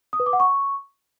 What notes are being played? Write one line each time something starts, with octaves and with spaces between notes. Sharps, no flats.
D#6
B4
D6
F#5
C#6